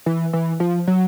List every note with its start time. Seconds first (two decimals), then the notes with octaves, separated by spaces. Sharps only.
0.06 E3
0.33 E3
0.60 F3
0.87 F#3